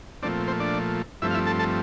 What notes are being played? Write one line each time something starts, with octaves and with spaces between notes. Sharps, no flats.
A#2 F3 A3 C4 D4 D5
C4 C5
D4 D5
G2 F3 A3 C4 E4 E5
F5
E4 E5
A4 A5
A4 A5